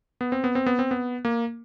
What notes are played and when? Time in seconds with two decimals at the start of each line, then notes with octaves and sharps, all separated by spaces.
0.21 B3
0.32 C4
0.44 B3
0.55 C4
0.66 B3
0.79 C4
0.91 B3
1.25 A#3